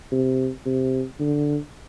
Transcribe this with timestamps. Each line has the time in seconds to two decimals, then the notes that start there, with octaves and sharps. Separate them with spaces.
0.12 C3
0.66 C3
1.20 D3